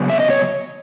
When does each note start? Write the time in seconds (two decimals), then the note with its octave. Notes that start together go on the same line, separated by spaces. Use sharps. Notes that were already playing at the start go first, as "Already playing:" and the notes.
Already playing: C#3 F#3 B3
0.10 E5
0.20 D#5
0.30 C#5